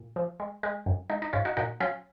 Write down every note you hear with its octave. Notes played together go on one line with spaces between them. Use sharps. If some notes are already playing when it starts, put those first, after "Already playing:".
Already playing: A#2
F3
G#3
G#3
F#2
G#3 D#4
D#4
G#2 C#4 F4
D#4 F#4
A#2 D#4 F#4
F#3 C#4 F4